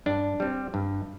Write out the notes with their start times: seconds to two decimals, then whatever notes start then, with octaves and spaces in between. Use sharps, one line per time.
0.06 G2 D4
0.40 G3 C4
0.74 G2